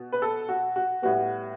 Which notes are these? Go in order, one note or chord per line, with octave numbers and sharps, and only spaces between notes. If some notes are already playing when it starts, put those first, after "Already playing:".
Already playing: B2
B4
A4
F#4
F#4
A2 G3 B3 F#4